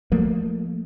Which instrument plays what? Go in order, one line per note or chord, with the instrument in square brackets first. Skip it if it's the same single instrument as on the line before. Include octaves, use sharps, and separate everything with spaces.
[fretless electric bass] F3 A3 A#3